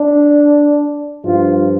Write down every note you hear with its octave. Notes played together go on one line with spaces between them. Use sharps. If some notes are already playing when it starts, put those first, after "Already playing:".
Already playing: D4
G2 F3 F4